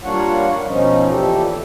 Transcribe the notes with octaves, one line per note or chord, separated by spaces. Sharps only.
G3 A#3 D4 F4 C#5 F#5
B2 F3 C#4 D#4
A#2 E3 G4 A4